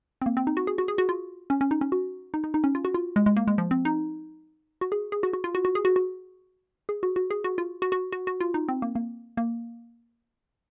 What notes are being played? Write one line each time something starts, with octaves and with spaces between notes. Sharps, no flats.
C4
A#3
C4
D#4
F#4
G#4
F#4
G#4
F#4
F4
C#4
C#4
D#4
C#4
F#4
D#4
D#4
D#4
C#4
F4
F#4
F4
G#3
G#3
A#3
G#3
F3
C4
D#4
F#4
G#4
G#4
F#4
F#4
F4
F#4
F#4
G#4
F#4
F#4
G#4
F#4
F#4
G#4
F#4
F4
F#4
F#4
F#4
F#4
F4
D#4
C4
A#3
A#3
A#3